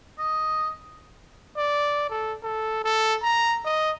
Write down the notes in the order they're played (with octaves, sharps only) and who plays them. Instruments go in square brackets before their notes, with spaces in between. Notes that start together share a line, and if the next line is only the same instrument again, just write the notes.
[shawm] D#5
[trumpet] D5
A4
A4
A4
A#5
D#5